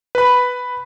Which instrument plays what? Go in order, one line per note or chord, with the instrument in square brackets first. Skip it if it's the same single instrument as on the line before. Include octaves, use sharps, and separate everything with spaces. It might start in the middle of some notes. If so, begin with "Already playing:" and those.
[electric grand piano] B4 B5